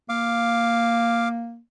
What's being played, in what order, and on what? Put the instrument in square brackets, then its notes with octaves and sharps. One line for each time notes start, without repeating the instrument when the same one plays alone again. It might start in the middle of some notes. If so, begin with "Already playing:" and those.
[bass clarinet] A#3 [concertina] F5 D6